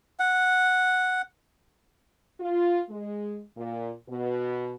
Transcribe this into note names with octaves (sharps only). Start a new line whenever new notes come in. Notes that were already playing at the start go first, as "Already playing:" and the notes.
F#5
F4
G#3
A#2
B2